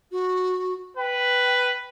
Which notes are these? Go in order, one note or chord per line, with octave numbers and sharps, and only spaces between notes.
F#4
B4 G5